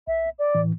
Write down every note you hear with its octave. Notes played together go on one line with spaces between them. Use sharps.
B1 E5
D5
A2 E3